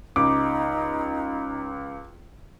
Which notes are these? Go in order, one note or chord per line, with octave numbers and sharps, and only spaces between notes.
C#2 D#4 D6